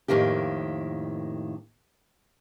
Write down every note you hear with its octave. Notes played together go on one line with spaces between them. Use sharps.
F2 A2 D#3 A#3 G4